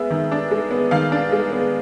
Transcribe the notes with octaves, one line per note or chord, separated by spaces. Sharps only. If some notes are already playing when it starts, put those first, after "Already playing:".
Already playing: G#3 B3 E5
D#3
D4
G#3
B3
D#3 F5
D4
G#3
B3